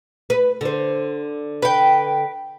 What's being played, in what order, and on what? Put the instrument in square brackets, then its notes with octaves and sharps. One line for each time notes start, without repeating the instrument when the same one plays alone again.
[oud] B4
D3 C5
[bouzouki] B4 G5